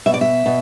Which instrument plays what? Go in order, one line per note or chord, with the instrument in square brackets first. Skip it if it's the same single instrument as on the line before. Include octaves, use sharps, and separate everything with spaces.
[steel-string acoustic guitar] B2 E5
D5
E5
B2